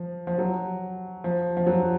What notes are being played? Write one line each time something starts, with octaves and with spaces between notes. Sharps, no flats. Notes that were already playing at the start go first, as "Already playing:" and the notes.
Already playing: F3
F3
F#3
F3
F3
F#3